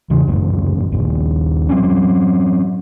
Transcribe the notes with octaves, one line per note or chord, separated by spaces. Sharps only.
E2 C#3
G1 C#2 F#2
D#1 A#1 D#2
F#3 C4 C#4